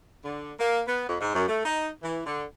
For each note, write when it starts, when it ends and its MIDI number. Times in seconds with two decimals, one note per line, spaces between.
0.24 0.52 50
0.59 0.82 58
0.87 1.05 59
1.08 1.16 41
1.20 1.33 44
1.35 1.48 42
1.49 1.63 57
1.65 1.89 63
2.03 2.24 52
2.26 2.44 50